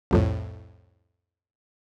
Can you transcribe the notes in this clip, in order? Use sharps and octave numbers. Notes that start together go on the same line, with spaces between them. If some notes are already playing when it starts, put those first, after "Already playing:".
C2 F2 A2